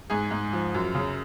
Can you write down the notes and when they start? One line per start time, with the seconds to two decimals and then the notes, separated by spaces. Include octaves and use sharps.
0.10 G#2 G#4
0.31 G#2
0.53 F3
0.74 F#2
0.95 C#3